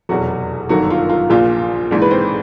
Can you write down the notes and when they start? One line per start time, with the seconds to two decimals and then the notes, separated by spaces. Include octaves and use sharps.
0.09 F1 E2 B2 F#3 F#4
0.69 G1 F#2 D#3 F#3 F#4
0.90 F4
1.10 F4
1.30 A#1 A#2 F3 F4
1.91 A#1 G#2 E3
2.02 B4
2.11 C4 C5